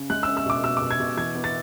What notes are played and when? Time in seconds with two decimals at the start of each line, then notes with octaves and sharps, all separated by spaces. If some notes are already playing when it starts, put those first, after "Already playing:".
Already playing: C#3
0.10 G#3 F#6
0.23 C#4 E6
0.37 E6
0.46 B2 D6
0.64 B2 E6
0.77 B2 D6
0.91 G#6
1.00 B2
1.17 E3 G#6
1.35 B3
1.44 A6